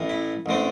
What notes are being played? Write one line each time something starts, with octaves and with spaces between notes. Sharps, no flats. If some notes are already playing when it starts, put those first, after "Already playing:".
Already playing: A1 A2 E3
E4
A1 D3 A3 C4